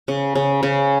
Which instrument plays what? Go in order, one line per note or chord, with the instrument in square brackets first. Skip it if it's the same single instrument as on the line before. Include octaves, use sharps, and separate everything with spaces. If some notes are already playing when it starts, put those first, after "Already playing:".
[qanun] C#3
C#3
C#3